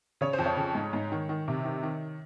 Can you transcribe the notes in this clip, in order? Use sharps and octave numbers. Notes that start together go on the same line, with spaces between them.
C#3 C#5
C5
F2
C#5
C#3
G#2
G#2
D#3
D#3
C3
D#3
D#3